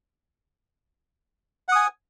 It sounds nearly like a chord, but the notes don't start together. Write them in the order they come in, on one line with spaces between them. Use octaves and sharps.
F#5 D#6 G#5